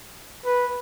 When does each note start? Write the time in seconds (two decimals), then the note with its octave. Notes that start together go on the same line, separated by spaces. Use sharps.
0.45 B4